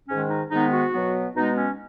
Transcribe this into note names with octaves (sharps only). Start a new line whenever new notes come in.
G#2 D#3 G#3 C#4
D#4
G#2 D#3 G#3 B3 D#4
F#4
B2 F#3 B3
B2 G#3 B3 D#4
C#4